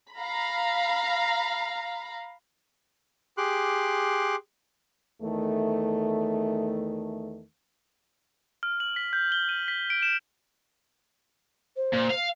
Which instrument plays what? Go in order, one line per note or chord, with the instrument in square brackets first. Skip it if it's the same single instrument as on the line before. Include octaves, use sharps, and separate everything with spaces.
[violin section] F5 A#5 B5
[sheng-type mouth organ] G4 G#4 C6 D6 F#6
[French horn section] E2 D#3 A3
[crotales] F6
F#7
B6
G6
G7
D#7
B6
D7
E7
[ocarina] C5
[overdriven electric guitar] A#2
F5